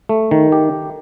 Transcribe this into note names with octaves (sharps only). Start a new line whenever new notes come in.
A3
D#3
G4